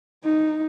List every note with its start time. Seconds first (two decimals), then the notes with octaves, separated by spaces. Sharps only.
0.24 D#4